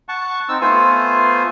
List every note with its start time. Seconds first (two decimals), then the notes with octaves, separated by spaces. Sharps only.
0.09 F#5 A5 C#6
0.49 C4 D#4 E6
0.61 A3 B3 F4 C5 G#5